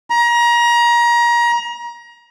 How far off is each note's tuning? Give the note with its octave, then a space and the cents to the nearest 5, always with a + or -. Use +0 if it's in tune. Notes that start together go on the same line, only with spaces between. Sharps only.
A#5 +30